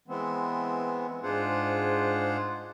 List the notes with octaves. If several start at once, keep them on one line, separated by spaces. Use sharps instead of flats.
E3 G#3 B3 C4
G#2 D4 F4 G#4 C5 F#5